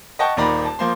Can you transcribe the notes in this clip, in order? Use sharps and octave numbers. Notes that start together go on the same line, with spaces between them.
D#5 F#5 G5 A5 C#6
D#1 D#2 D#3 D5 A#5 B5
A5
F3 A#3 C5 C6